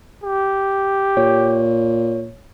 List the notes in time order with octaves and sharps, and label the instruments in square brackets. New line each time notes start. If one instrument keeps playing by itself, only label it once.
[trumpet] G4
[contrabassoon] A#2 [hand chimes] C#5